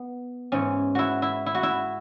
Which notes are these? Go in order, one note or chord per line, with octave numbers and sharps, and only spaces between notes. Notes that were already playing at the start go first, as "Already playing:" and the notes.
Already playing: B3
G#2 E3 C#4
E4 F#4
E4
E4
F#4
E4